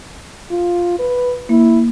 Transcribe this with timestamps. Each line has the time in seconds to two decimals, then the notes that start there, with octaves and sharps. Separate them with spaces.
0.50 F4
0.99 B4
1.49 A#3 E4